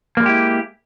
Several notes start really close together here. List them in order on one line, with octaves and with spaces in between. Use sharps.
A#3 G3 G#3 G4 E4